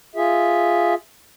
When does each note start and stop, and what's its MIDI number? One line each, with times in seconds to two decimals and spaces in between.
0.16 0.94 65
0.16 0.94 68
0.16 0.94 76